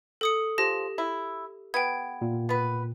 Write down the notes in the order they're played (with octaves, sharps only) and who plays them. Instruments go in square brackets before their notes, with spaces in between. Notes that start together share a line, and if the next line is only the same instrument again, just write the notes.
[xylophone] A4 D#6 C#7
[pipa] F3 [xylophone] G4 A#6
[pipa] E4
[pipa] B3 [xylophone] G5 G#6
[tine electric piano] A#2
[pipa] B3 B4